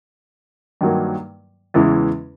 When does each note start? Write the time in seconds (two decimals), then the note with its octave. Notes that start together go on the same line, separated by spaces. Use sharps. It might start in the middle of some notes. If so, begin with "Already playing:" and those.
0.81 G2 D#3 F#3 A#3
1.74 E2 C#3 E3 G#3